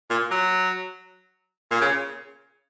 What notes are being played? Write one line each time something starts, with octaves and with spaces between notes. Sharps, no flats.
A#2
F#3
A#2
C#3